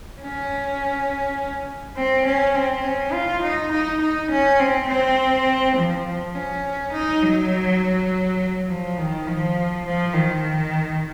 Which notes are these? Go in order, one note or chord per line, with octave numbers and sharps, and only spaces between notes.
C#4
C4
C#4
C4
C#4
F4
D#4
D#4
D#4
C#4
C4
C4
F3
F3
C#4
D#4
F#3
F3
D#3
F3
F3
D#3